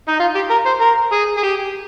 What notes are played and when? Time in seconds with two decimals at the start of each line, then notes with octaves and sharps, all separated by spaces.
0.08 D#4
0.20 F4
0.35 G4
0.51 A#4
0.66 C5
0.81 A#4
1.12 G#4
1.37 G#4
1.43 G4